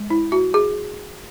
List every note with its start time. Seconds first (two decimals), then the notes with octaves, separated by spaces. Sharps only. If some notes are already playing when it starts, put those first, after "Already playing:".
Already playing: G#3
0.10 E4
0.32 F#4
0.54 G#4